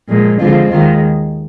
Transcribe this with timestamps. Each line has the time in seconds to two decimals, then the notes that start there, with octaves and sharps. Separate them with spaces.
0.09 A#2 F3 G#3
0.40 D3 F3 G#3 C4 F4
0.71 D#2 D#3 G#3 F4